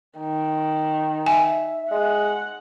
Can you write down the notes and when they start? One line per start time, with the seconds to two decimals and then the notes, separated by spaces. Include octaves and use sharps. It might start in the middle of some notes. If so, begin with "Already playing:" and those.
0.19 D#3
1.26 E5 G#5
1.91 G#3 F#5